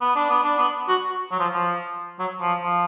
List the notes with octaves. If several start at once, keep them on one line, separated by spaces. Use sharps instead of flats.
B3
D4
B3
D4
B3
F#4
F#3
F3
F3
F#3
F3
F3